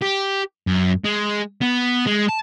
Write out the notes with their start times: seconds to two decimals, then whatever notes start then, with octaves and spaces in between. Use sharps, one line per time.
0.02 G4
0.67 F#2
1.04 G#3
1.62 B3
2.07 G#3
2.29 A5